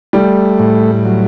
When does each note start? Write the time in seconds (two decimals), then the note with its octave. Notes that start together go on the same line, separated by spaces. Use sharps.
0.13 G3 A3
0.59 A2
1.05 F#3